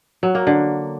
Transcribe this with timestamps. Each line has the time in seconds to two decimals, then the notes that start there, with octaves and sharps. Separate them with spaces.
0.23 F#3
0.35 A#3
0.47 D3